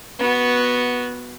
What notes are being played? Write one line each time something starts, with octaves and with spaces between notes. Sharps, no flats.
B3 F#4